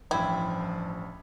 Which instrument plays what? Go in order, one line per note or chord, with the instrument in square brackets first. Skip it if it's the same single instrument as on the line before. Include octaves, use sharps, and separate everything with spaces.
[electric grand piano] A1 G2 G#6 [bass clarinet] F3 [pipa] G3 C4 E4